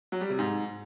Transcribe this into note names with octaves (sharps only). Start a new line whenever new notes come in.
F#3
G3
C3
G#2